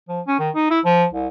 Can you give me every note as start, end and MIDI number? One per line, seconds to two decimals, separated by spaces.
0.09 0.21 53
0.27 0.36 61
0.39 0.50 51
0.55 0.70 63
0.70 0.80 64
0.85 1.05 53
1.13 1.28 36